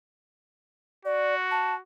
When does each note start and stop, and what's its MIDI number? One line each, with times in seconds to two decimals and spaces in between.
1.05 1.79 66
1.05 1.35 74
1.51 1.75 81